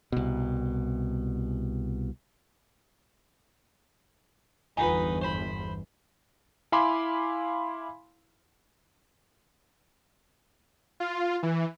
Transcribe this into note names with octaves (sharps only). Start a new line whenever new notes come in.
C2 B2
G1 E2 D#4 F4 B4 F#5 G#5
C5 B5
E4 F5 G#5 B5 C6 D6
F4
E3